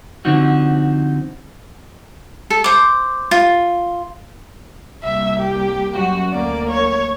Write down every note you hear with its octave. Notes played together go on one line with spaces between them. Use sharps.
D3 F3 C4 D#4 F#4
A4
C5 D6
F4
C2 G3 A#3 E5
G4
F#2 F#4
D2 A#3 D5
C#5